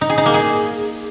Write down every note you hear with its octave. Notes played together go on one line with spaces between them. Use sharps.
D#4
G#4
D#4
A#3
G#4